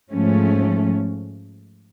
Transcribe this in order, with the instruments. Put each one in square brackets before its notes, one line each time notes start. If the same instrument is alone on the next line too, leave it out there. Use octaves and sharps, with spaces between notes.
[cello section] G#2 F3 A3 C#4